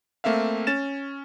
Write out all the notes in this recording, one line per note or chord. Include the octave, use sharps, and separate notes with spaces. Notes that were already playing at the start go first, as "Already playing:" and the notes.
A3 A#3 C4 E5 F5
C#4 A6 E7